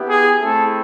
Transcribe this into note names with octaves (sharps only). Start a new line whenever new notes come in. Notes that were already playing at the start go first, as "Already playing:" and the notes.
Already playing: B3 E4 G4
G#4
A3 C4 E4 A4